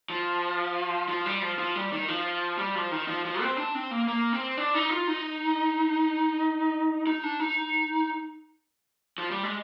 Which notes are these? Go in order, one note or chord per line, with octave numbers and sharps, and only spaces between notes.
F3
F3
G3
F3
F3
G3
D#3
F3
G3
F3
D#3
F3
F3
C4
D4
C4
A#3
A#3
C4
D4
D#4
F4
D#4
D#4
D4
D#4
F3
G3
G#3